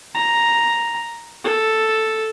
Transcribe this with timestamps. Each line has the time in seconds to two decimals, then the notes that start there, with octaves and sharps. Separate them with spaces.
0.15 A#5
1.44 A4